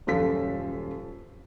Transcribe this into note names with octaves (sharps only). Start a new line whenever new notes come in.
D#1 F#2 F3 F4 A4 B6